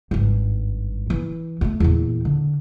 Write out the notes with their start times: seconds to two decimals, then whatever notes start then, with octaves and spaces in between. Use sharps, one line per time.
0.11 G#1 G2
1.10 E3
1.61 G2 A3
1.80 E2 A#2
2.25 D3